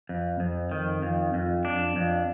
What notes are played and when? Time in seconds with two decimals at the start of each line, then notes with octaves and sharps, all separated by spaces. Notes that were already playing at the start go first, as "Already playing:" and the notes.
0.09 F2
0.40 F2
0.72 D#3
1.02 F2
1.34 F2
1.65 D4
1.96 F2